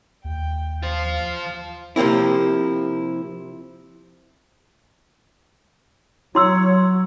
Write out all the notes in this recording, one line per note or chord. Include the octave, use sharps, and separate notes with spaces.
D#2 G5
F4 C5 F5
C3 F3 A#3 C4 E4
F#3 E4 C#5 C6 E6